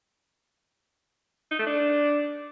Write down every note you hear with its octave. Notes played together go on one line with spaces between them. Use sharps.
D#4
A3
D4